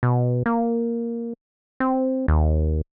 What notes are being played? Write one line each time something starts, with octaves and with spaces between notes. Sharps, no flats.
B2
A#3
C4
D#2